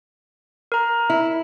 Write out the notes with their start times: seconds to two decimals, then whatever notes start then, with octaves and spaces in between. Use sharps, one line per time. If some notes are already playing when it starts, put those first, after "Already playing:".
0.72 A#4 A#5
1.10 E4